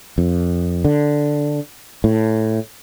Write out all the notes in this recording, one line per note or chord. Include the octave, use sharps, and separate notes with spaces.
F2
D3
A2